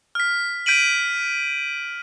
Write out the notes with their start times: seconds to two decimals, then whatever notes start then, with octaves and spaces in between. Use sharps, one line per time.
0.15 F6 B6
0.66 G6 B6 D7 D#7 F#7